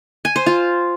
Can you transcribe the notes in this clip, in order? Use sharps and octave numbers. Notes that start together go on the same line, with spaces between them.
G#5
C5
F4